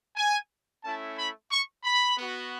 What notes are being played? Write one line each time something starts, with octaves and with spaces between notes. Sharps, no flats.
G#5
A3 C#4 E4 A5
B5
C#6
B5
B3 F#4